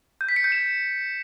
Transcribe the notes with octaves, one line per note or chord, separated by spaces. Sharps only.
G6
B6
C#7
G6
E7